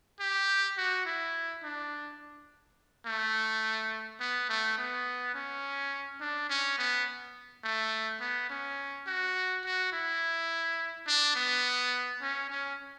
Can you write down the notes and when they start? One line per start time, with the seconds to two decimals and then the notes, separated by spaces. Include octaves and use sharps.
0.20 G4
0.77 F#4
1.06 E4
1.63 D4
3.06 A3
4.20 B3
4.49 A3
4.78 B3
5.35 C#4
6.21 D4
6.50 C#4
6.78 B3
7.64 A3
8.21 B3
8.50 C#4
9.07 F#4
9.65 F#4
9.93 E4
11.07 D4
11.36 B3
12.22 C#4
12.50 C#4